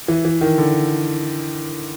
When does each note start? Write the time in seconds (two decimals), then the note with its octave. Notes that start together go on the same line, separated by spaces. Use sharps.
0.08 E3
0.25 E3
0.41 D#3
0.58 D3